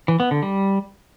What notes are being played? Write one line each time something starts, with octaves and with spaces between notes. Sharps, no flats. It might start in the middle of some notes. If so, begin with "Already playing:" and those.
E3
B3
D3
G3